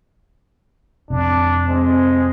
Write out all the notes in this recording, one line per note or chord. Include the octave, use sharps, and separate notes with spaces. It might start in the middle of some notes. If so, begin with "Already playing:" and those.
F2 C3 D4
G#3 C4